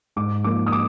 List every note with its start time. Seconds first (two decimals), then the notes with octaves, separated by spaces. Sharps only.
0.16 G#2 D6
0.44 F3 A#3 D6
0.67 D#6
0.72 D6